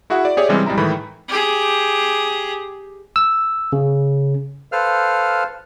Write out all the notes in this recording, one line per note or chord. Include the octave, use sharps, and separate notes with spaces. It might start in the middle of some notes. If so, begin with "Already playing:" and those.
E4 F#4 G#4 E5 F#5
D5
G4 G#4 C#5 D5 E5
C3 E3 G3 G#3 C4 C#4
A#1 G3 G#3 E4 A#5
A2 D#3 E3 G#3 A4 B5
G4 G#4
E6
C#3
A4 B4 C5 F5 F6